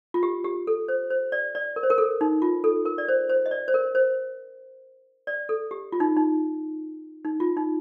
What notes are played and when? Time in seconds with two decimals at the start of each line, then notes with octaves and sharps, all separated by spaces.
0.14 F4
0.23 G4
0.44 G4
0.67 A4
0.88 C5
1.10 C5
1.32 D5
1.55 D5
1.76 A#4
1.83 C5
1.90 A#4
1.98 A4
2.21 D#4
2.42 F4
2.64 A4
2.85 A#4
2.98 D5
3.08 C5
3.29 C5
3.46 D#5
3.51 D5
3.68 C5
3.74 A#4
3.95 C5
5.27 D5
5.49 A4
5.71 G4
5.92 F4
6.00 D#4
6.16 D#4
7.25 D#4
7.40 F4
7.57 D#4